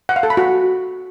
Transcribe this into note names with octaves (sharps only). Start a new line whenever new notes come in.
F#5
F5
A4
B5
F#4